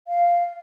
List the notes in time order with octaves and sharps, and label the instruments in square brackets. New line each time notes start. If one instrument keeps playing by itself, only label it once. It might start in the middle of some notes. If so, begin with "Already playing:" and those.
[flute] F5